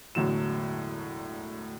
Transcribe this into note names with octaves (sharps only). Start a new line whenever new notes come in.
E1 A2 D3 F#3 E7